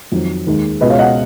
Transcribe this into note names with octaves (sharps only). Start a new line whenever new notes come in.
F2 D#3 F#3
D#2 D#3 G#3
C#2 B2 G#3 B4 D#5
C#5 F5
D#5 F#5